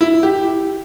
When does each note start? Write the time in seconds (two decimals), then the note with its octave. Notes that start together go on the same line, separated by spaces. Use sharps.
0.01 E4
0.23 G4